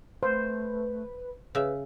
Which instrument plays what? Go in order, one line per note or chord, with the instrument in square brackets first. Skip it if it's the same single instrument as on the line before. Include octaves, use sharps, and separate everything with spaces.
[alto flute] A3 [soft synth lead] B4 [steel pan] C5
[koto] C#3 E5 [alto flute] B4